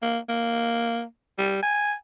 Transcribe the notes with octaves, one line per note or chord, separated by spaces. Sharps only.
A#3
A#3
G3
G#5